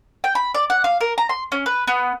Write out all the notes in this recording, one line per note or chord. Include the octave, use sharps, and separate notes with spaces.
G5
B5
D5
F#5
F5
A#4
A#5
C6
C#4
B4
B3